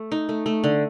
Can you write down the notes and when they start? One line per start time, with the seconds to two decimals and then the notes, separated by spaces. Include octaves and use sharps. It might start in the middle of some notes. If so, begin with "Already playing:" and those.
Already playing: A3
0.12 D#4
0.29 A3
0.46 A3
0.64 D3